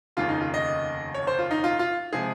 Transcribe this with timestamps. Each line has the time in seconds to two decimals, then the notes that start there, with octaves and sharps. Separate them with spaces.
0.17 F1 D#2 C#3 F4
0.29 D#4
0.41 F4
0.54 D#5
1.14 C#5
1.27 C5
1.39 F4
1.51 D#4
1.64 F4
1.79 F4
2.13 C3 F3 G#3 G#4